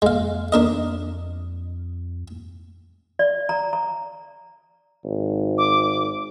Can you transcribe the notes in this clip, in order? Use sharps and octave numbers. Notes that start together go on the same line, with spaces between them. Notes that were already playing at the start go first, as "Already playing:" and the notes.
F2 G#3 F5
D4 A#4 D#5
D5
A#5
A#5
G#1
D6